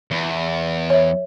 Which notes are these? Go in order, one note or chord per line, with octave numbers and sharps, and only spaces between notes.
E2
C#5 E5